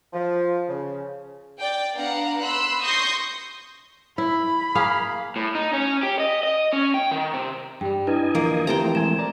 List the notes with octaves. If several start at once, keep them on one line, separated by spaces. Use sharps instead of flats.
F3
C#3
D5 G5
B3 D4 F5 F#5 A#5
B5 C6 E6 F#6
C6 C#6 D#6 G6 A#6 C7
E4 B5
A#3 G#4 F5
A2
D#4
C#4
G4
D#5
D#5
C#4
G5
D#3
C3
G2 G3 G4 G5
D4 E4 B4 D#5 G#5
E2 D3 F3 A#3
E3 A3 C4 G4 G5 A5 A#5
G#3 G#5 E7
A#4 D5 A#5